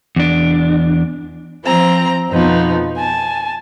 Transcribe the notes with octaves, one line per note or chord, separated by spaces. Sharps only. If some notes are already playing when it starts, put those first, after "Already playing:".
E2 D4
F3 C4 A#5
F2 B2 F3 B3 D#4
G#5 A5